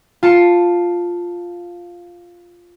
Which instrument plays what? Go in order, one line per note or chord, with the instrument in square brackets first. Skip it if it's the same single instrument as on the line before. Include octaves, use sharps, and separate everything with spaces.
[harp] F4 A5 C#7